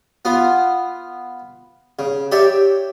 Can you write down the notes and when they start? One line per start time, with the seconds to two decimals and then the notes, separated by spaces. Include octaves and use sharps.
0.25 B3 F4
1.99 C#3
2.32 G4 C#5 D5 E5